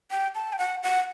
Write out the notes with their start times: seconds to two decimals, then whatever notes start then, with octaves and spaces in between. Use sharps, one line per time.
0.11 G5
0.35 A5
0.53 G5
0.59 F#5
0.83 F#5